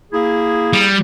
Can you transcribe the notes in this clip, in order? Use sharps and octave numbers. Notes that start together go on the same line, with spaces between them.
A#3 E4 G#4
G3